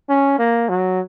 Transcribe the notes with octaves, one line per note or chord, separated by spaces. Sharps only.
C#4
A#3
F#3